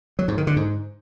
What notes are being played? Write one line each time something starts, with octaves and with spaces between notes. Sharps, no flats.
F#3
G#2
D#3
D3
G#2